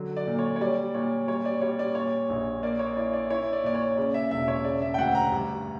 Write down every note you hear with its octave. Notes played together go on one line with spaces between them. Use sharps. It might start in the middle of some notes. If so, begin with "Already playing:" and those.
Already playing: D3 F#3
D5
A#2
C#5
C#5
G3 D5
A#2 C#5
G3 C#5
D5
G3 C#5
D5
A#2 C#5
A#1
A#3 D5
C#5
E4 D5
D5
E4 C#5
D5
A#2 D5
C#5
C#3 D5
E5
E1 E5
C#5
C#3 D5
E5
G5
D2 F#5
A#5
G2